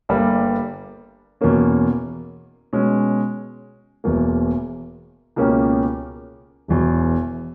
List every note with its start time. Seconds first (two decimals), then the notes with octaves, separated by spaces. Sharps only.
0.09 G1 G2 G3 A#3
1.41 E2 B2 A#3 C#4
2.73 B2 G#3 C#4
4.04 E1 E2 B2 A#3
5.36 C#2 B2 A#3 C#4 G4
6.68 E1 E2 B2